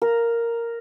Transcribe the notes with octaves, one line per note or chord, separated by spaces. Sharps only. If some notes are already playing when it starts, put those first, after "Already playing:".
A#4